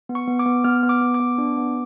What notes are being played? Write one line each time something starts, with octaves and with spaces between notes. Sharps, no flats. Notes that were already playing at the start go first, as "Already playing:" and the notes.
B3
C#6
B3
D6
B3
B3 F6
B3
D6
B3
D6
B3
D4
B3